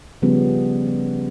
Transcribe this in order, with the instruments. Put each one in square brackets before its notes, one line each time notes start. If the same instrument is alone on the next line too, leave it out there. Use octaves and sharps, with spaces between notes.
[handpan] C#3 F3 G3 B3 C#4